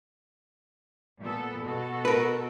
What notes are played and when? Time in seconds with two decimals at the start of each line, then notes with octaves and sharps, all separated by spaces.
1.21 A#2 B3 A4
1.62 B2 F#4 A4
2.05 A#4 B4